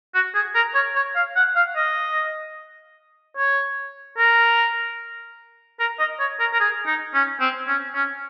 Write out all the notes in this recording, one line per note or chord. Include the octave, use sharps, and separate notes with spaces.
F#4
G#4
A#4
C#5
C#5
F5
F#5
F5
D#5
C#5
A#4
A#4
D#5
C#5
A#4
A#4
G#4
D#4
C#4
C4
C#4
C#4